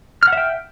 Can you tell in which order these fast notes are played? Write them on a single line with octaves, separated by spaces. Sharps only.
F6 F#5 E5 G5